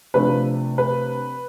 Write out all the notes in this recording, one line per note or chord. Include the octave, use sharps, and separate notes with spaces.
C3 F3 A3 D4 B4
B4